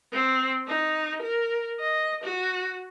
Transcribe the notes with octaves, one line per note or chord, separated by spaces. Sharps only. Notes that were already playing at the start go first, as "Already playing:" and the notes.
C4
D#4
A#4
D#5
F#4